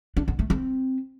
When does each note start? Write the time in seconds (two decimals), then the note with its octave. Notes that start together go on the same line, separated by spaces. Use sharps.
0.17 D4
0.28 B3
0.39 A3
0.50 C4